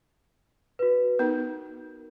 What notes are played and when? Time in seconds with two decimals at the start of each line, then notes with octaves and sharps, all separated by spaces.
0.79 F#4 B4
1.19 B3 D#4 A#4